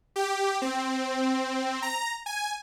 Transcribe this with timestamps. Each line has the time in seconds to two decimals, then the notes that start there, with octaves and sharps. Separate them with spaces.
0.16 G4
0.62 C4
1.82 A#5
2.26 G#5